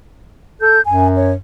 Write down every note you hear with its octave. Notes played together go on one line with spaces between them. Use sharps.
A4 G6
F#2 G#5
C#5